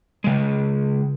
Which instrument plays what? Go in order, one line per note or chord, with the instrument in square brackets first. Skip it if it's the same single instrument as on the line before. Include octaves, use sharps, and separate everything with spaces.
[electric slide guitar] C#3 G#3